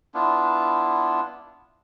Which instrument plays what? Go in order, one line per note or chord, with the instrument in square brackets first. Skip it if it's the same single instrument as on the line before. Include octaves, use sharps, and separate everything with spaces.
[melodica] B3 D4 E4 F4